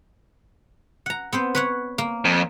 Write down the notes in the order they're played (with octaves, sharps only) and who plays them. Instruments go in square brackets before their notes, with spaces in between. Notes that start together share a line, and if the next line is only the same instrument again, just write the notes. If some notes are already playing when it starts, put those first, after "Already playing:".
[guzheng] F#5 A#5
B3 C4 C5
B4 C#5 F#5
A#3
[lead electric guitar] F2